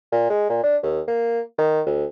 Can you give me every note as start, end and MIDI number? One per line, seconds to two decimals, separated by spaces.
0.12 0.25 46
0.30 0.47 56
0.49 0.60 46
0.63 0.77 62
0.83 1.00 39
1.08 1.41 58
1.58 1.81 51
1.86 2.05 38